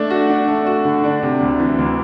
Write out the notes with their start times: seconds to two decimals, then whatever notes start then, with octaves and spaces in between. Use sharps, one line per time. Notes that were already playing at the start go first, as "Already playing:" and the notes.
Already playing: A3 D4
0.10 F#4
0.29 D4
0.48 A3
0.67 F#4
0.85 D3
1.04 D4
1.22 C3
1.41 D2
1.60 E3
1.78 D2